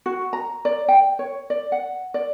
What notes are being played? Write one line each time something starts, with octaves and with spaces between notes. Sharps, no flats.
F#4
A#5
D5
G5
C#5
D5
F#5
D5